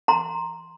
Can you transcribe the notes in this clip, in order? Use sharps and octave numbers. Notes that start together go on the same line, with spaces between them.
A#5 C6